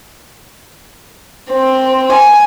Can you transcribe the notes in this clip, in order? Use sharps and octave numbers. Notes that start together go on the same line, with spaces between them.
C4
G#5